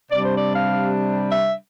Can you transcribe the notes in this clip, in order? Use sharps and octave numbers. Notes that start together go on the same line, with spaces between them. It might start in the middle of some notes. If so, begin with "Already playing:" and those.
C3 G3 D4 D5
C5
D5
F5
E5